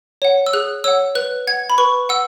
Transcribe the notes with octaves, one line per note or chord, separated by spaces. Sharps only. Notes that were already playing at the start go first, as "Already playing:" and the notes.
C#5 F#5
E6
G#4 F#6
C#5 F#5 E6
B4 F#6
F#5 G#6
B5
B4 C#6
F#5 E6